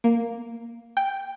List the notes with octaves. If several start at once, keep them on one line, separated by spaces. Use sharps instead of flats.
A#3
G5